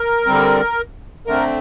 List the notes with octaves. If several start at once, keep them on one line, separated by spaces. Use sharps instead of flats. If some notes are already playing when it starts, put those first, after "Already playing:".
Already playing: A#4
D3 G3 C4
D3 A3 C4 A#4